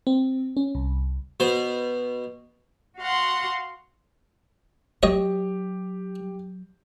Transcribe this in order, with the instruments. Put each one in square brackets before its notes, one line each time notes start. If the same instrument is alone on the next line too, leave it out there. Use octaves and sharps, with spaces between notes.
[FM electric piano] C4
C#4
C2
[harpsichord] B2 C5
[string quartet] F#4 F5 F#5 C6
[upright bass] F#3 [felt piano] G4 [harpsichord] C#5 D#5